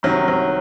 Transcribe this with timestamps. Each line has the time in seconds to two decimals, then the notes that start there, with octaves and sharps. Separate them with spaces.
0.03 C2 C3 D#3 F#3
0.28 F#3